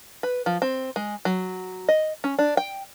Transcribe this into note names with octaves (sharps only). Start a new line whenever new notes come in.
B4
F3
C4
G#3
F#3
D#5
C#4
D4
G5